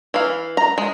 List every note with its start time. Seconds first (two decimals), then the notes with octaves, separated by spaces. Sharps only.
0.14 E3 F5
0.57 A#5
0.78 G#3